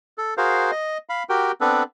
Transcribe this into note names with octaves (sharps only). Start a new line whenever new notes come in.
A4
F#4 G#4 A#4 C5 F5
D#5
F5 B5
F#4 G4 A#4 G5
B3 C4 D4 A4 B4